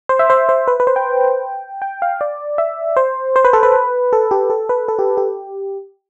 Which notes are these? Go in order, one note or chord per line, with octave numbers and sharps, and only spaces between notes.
C5
E5
C5
C5
B4
B4
C5
G5
G5
F5
D5
E5
C5
C5
B4
A4
B4
A4
G4
A4
B4
A4
G4
G4